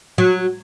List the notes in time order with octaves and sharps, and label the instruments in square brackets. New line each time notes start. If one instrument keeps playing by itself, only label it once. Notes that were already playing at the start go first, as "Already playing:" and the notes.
[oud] F#3